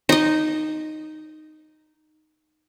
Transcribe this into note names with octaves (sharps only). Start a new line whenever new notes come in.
D#4 D#5